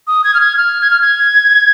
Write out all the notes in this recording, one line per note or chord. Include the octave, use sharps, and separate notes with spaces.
D#6
G#6
F6
G#6
F6
G#6
F6
G#6